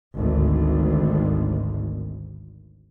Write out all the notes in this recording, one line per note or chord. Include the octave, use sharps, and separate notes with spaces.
G#1 D2